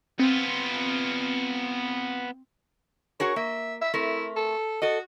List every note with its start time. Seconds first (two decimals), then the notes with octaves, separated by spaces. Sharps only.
0.20 B3 C4 F4
3.20 F#4 G#4 A#4 C#5
3.36 A#3 E5
3.81 E5
3.94 A3 C4 E4 A#4
4.36 A4
4.82 F#4 A4 D#5